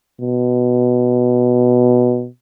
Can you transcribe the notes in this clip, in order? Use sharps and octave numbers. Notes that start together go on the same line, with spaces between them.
B2